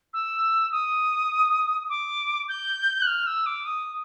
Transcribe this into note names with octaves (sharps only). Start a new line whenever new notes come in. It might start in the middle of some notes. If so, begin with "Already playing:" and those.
E6
D#6
D6
G6
F#6
F6
E6
D6
D#6